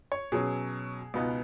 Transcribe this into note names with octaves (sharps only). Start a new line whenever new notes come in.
C#5
B2 F#3 C#4 G#4
C#2 B2 B3 D#4